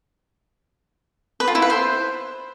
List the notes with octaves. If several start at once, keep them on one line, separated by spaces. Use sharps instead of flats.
B4
F4
E4
B4
C5